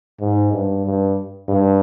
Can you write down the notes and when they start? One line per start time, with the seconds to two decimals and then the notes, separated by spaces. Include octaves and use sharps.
0.21 G#2
0.52 G2
0.85 G2
1.48 G2